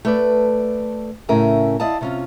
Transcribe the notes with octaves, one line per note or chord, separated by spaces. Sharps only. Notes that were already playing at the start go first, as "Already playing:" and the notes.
A3 B4 D5
A2 C#3 C#4 A#4 E5 G#5
E4 D5 D#5 F5 A5
C3 C#4 F4